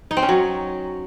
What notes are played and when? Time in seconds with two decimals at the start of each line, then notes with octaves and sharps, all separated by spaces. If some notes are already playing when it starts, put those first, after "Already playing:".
0.11 D#4
0.17 C4
0.23 C#4
0.29 F#3